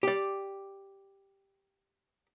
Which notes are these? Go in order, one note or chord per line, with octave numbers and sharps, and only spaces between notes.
G4 D5